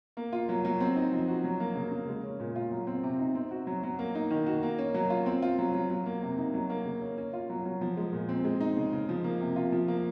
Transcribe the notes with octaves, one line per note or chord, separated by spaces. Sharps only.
A#3
F4
F#3
F#3
C4
D#4
F3
F#4
F#3
A#3
C#3
C#3
G#3
C#4
A#2
F4
F#3
C4
C3
D#4
C4
F#4
F#3
F#3
A#3
D#4
D#3
F#4
A#3
C#4
F#3
F4
C4
F4
F#3
F#3
F#3
A#3
C3
D#4
F#3
A#3
C#3
C#4
C#4
F4
F#3
F#3
F3
G#3
A#2
C4
G#3
D#4
C#3
C#3
F3
A#3
C3
F4
F3
A#3